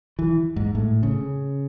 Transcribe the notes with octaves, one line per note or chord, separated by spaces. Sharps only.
E3
G#2
A2
C#3